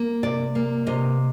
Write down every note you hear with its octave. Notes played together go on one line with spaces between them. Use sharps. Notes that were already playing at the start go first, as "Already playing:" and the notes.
Already playing: A#3
C3 D5
A#3
C3 D#5